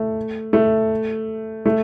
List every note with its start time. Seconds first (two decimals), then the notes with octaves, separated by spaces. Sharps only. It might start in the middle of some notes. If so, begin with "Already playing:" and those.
Already playing: A3
0.53 A3
1.66 A3